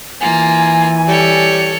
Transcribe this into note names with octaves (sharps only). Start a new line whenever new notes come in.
E3 A#3 F4 G#5
G3 A4 C#5